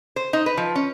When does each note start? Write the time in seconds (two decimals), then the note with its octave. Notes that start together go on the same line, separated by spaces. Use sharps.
0.16 C5
0.33 D#4
0.46 B4
0.57 F3
0.76 C#4